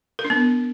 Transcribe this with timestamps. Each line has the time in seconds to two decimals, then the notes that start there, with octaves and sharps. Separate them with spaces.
0.19 A#4
0.25 D4
0.30 B3